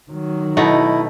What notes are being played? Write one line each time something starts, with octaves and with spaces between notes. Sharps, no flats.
D#3 F#3
B2 A3 D#4 E4